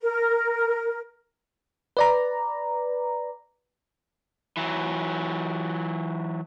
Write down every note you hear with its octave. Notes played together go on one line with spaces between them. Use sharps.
A#4
B4 D5 A#5
E3 F#3